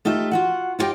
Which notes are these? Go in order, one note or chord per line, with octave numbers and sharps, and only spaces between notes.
A3 D#4 F4 G4 E5
F4 F#4 F#5
E4 F4 G4 D#5 G5